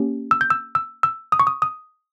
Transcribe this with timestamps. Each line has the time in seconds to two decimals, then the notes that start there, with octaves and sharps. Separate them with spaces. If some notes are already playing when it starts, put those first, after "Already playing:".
Already playing: A#3 C#4 G4
0.31 E6
0.41 G6
0.50 E6
0.75 E6
1.03 E6
1.32 D#6
1.40 C#6
1.47 D#6
1.62 D#6